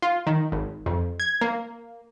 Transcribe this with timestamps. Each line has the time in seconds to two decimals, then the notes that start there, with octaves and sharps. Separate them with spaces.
0.02 F4
0.27 D#3
0.52 G#1
0.86 F2
1.20 G#6
1.41 A#3